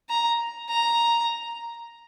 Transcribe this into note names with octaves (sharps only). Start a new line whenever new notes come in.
A#5
A#5